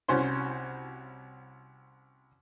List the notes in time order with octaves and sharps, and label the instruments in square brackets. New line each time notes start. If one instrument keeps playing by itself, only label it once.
[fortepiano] C2 C#4 F#4 C5 C6